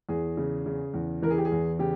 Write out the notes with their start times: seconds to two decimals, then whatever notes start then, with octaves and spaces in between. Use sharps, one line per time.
0.09 E2 G#4
0.37 C#3
0.66 C#3
0.94 E2
1.22 E3 A#4
1.30 G#4
1.38 G4
1.45 G#4
1.52 E2
1.79 C#3 G4